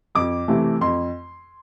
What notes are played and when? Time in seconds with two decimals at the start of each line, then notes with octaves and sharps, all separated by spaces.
0.15 F2 D6
0.48 C3 E3 A3
0.81 F2 C6